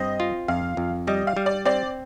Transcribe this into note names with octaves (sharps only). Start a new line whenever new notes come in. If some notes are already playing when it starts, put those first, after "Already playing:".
Already playing: G2 C4 D#5
F4
F2 F5
F2
G3 D#5
F5
G3
D5
C4 D5